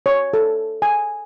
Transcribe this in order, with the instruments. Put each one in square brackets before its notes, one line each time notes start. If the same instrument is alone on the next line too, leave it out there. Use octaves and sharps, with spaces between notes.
[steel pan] C#5
A4
G#5